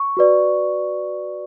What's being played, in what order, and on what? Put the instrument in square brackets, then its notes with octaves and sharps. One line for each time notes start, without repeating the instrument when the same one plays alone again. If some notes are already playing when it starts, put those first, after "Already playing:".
Already playing: [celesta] C#6
F#4 B4 D5